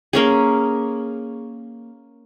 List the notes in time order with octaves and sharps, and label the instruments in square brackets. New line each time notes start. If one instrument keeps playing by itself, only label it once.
[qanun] A#3 C#4 G#4